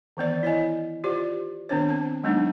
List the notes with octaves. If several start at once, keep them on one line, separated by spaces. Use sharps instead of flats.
D#3 E3 B3 D5
E4 C#5 D#5 G#5
F4 G4 C5 D5
D#3 B3 C4 D4 C5 C#5
C4 A5
F#3 G#3 A#3 B3 D4 D#4